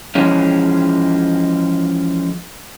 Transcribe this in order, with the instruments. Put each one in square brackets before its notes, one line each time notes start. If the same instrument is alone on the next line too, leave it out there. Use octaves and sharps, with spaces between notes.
[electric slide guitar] E3 F3 G#3 C#4